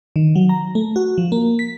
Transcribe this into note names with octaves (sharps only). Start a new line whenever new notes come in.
D#3
F#3
A#5
A3
F#4
F3
A#3
B6